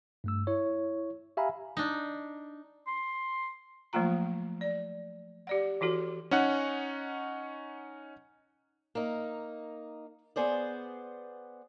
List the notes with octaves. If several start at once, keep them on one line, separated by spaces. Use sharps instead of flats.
G2 A3 E6
E4 C#5
G4 E5 F5 G#5 A#5 B5
D4 D#4
C6
F3 F#3 A3 A#3 F4 A#5
D5
G4 D5 F#5
E3 E4 F#4 A4
C#4 D#4 F#5 F#6
A#3 D#4
B3 G#4 C5 D5